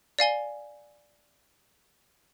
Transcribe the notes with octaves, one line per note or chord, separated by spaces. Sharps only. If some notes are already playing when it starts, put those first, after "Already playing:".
D5 F5 G#5 G7